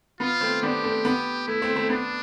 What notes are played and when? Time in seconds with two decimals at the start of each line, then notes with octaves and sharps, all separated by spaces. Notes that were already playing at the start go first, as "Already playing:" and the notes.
0.20 B3 F4
0.41 A3 C4
0.62 B3 D4 G4
0.84 A3 C4
1.05 B3
1.47 A3 E4
1.62 A3 C4
1.76 A3 C4
1.90 B3 D4